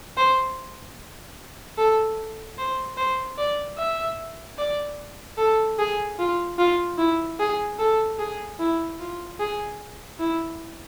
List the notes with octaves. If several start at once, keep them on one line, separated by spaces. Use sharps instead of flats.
C5
A4
C5
C5
D5
E5
D5
A4
G#4
F4
F4
E4
G#4
A4
G#4
E4
F4
G#4
E4